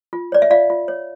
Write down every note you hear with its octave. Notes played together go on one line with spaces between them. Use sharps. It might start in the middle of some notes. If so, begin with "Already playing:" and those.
F4
C#5 D5
E5
F4 D5 F5
F4
C#5